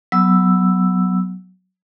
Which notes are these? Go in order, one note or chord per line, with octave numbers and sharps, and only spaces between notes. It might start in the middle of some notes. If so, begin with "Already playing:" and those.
F#3 B3 E6